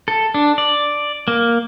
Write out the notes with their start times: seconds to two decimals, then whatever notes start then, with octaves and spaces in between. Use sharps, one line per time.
0.08 A4
0.34 D4
0.58 D5
1.28 A#3